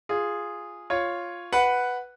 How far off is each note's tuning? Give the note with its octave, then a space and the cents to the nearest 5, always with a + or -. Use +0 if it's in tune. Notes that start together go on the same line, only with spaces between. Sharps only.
F4 +0 G#4 -5
F4 +0 C#5 +0
B4 +0 F#5 +0